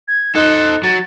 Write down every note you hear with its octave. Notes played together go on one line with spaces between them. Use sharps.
G#6
D#4 A4 C5 F#6
F#3 A6